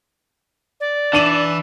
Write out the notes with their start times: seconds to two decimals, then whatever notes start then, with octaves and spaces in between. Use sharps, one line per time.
0.80 D5
1.13 E3 D4 E4 D#7 F#7